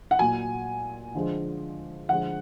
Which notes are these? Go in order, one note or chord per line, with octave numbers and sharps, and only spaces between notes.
F#5
A#2 F#3 G#5
D3 F3 G#3
D3 F3 G#3 F#5